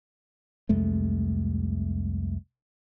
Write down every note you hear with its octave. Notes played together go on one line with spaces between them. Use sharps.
C2 F2 G#3 A3